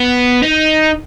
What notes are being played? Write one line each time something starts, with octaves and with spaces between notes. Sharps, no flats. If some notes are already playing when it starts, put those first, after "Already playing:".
Already playing: B3
D#4